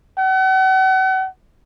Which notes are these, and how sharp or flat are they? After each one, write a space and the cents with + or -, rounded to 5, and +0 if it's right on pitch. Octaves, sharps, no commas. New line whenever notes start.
F#5 +40